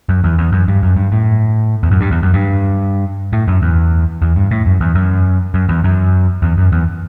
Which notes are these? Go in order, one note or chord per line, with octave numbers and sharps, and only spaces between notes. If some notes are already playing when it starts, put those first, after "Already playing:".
F#2
E2
E2
F#2
G2
F#2
G2
A2
E2
F#2
G2
E2
F#2
G2
A2
F#2
E2
E2
G2
A2
F#2
E2
F#2
F#2
E2
F#2
E2
F#2
E2